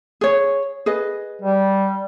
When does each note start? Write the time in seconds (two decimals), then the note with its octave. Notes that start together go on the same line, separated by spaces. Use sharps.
0.21 G#4 C#5
0.86 G#4 B4 D#5
1.42 G3